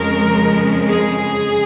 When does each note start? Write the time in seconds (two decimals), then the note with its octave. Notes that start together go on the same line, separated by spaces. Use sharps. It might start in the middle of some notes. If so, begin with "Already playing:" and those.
Already playing: F2 C#3 G#3 A#4
0.88 G#4